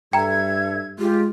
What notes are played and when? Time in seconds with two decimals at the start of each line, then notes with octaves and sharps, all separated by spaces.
0.13 G2 A4 E5 G5 A#5 G#6
0.99 G#3 F4 G4